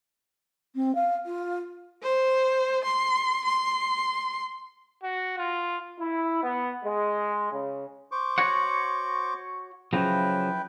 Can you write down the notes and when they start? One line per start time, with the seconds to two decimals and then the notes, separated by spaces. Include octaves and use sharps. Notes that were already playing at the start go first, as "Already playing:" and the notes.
0.75 C4
0.95 F5
1.25 F4
2.03 C5
2.84 C6
3.45 C6
5.03 F#4
5.38 F4
5.99 E4
6.43 B3
6.85 G#3
7.52 C#3
8.12 C5 C#6 D6
8.38 F#4 C#5 F#5
9.93 C#3 F3 F#3 E4 B4 G5